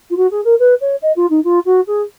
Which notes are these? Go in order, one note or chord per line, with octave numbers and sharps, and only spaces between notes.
F4
F#4
G#4
A#4
B4
C#5
D#5
F4
D#4
F4
F#4
G#4